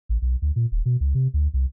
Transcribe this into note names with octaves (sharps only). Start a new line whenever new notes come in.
A1
B1
D2
A#2
D#1
B2
C#2
C3
D2
C2